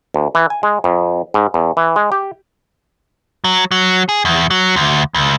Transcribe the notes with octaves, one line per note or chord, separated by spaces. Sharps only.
D2
E3
G#5
G#3
F2
G#2
E2
E3
G#3
G4
F#3
F#3
G#4
E2
F#3
D2
C#2